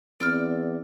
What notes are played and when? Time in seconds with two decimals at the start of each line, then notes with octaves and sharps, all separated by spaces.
0.20 E2 C4 D5 E6 F6